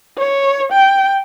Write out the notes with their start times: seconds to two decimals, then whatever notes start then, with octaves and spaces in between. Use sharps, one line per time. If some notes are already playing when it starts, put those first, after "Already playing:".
0.18 C#5
0.72 G5